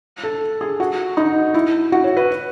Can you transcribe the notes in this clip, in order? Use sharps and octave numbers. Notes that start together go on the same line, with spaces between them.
A4
G#4
F#4
D#4
E4
F#4
C#5
B4